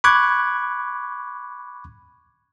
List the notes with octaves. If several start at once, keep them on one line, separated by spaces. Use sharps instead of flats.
B5 C#6 D6 F#6 G#6